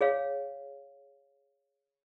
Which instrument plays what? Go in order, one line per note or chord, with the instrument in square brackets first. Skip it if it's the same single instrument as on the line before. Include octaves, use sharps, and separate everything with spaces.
[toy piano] G#4 C#5 F5